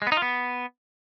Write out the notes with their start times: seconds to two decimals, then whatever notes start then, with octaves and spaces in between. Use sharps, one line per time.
0.02 G#3
0.07 B3
0.12 D#4
0.17 F4
0.22 B3